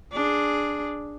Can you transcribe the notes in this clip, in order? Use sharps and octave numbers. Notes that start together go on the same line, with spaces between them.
D4 G#4